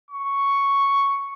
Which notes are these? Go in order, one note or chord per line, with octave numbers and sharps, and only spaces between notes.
C#6